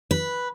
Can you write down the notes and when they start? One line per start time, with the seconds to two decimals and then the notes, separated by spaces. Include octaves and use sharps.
0.11 B4